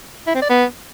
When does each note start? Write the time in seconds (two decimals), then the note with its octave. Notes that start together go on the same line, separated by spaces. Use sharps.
0.27 E4
0.34 C4
0.42 D5
0.49 B3